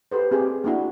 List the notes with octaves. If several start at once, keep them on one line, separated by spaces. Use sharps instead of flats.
G4 A4 B4 C5
C4 G4 G#4
A#3 D4 E4 F#4